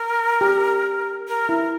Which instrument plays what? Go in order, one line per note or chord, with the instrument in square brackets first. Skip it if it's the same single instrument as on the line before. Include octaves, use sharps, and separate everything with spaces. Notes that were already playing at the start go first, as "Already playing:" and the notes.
Already playing: [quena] A#4
[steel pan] G4
[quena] A#4
[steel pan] E4